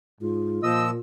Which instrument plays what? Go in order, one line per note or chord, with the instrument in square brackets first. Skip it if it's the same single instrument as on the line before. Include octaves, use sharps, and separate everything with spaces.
[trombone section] G#2 [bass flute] F4
[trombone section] A#2 [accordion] F3 E6 [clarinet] D#5